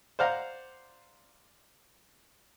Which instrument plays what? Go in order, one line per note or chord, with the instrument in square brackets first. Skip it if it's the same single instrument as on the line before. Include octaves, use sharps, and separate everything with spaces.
[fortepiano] C5 D5 F5 F#5 A#5